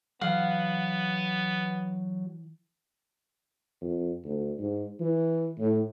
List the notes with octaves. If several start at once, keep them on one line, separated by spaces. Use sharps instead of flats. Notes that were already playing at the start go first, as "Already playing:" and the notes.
E3 F#3 B3 F5 F#5
F2
D2
G#2
E3
A2